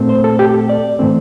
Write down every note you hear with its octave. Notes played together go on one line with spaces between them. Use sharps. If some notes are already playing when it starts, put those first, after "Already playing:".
Already playing: A#2 A3 C4
C5
A4
G4
A4
D5
A2 E3 A3 C4